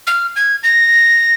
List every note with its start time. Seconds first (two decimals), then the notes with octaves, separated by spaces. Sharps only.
0.07 F6
0.36 G#6
0.63 A#6